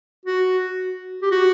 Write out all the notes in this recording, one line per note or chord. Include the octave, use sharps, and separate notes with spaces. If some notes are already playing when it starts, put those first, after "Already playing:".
F#4
G4
F#4